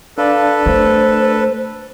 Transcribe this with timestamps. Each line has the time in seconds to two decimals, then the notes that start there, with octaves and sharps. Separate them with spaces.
0.18 D4 A4 B4 D5 F5 A5
0.66 A3 C5